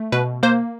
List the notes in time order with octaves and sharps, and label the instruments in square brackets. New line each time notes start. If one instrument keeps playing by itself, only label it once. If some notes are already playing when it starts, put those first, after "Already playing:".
Already playing: [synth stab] A3
B2 B4
A#3 C5